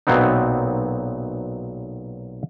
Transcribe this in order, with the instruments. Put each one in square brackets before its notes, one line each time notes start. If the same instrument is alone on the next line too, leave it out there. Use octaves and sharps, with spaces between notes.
[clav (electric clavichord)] B1 A#2 F#3 B3 C4 D#4